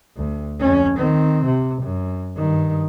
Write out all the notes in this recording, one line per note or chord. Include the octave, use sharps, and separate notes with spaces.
D2
F2 C#4
D#3 C4
C3
F#2
G2 D#3